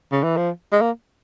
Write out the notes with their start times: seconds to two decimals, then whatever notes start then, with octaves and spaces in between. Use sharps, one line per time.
0.12 C#3
0.23 E3
0.36 F3
0.72 G#3
0.81 A#3